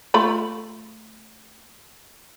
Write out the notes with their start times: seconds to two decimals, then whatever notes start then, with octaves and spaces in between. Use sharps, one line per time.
0.14 A3 F4 B5